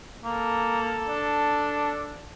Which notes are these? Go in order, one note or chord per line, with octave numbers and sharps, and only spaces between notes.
A#3 A4
D4